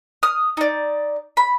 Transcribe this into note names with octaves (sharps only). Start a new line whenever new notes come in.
D#6 F6
D#4 D5
B5